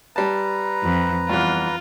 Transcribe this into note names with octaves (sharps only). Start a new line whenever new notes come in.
G3 B4 A5 A#5
F2
E2 G2 F4